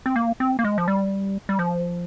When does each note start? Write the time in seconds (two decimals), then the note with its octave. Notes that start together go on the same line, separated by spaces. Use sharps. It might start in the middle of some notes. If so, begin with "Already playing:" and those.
0.06 C4
0.16 A#3
0.40 C4
0.59 A#3
0.64 G#3
0.78 F3
0.88 G3
1.49 G3
1.59 F3